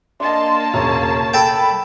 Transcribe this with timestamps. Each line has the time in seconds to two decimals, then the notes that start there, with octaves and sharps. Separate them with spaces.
0.20 A#3 D4 D#5 A5 C6
0.73 E1 C#3 C#5 A#5
1.34 A4 G5 B5 E7